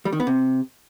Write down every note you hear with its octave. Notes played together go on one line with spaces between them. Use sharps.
G3
D#3
B3
C3